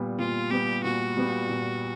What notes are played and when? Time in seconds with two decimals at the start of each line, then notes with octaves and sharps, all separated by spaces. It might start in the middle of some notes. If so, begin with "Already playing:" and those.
Already playing: A#2 G3 B3
0.19 A#2 F4
0.51 G3 B3 G4
0.84 A#2 F#4
1.17 G3 B3
1.49 A#2